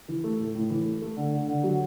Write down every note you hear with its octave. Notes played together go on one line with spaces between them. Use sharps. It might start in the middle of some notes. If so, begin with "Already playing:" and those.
E3
A3
A2
A2
E3
A3
A3
D3
D3
D3
F#3